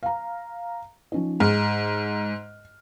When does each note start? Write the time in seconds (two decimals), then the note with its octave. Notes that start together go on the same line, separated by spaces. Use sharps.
0.03 F5 A#5
1.12 F3 C#4 D#4
1.40 G#2 F6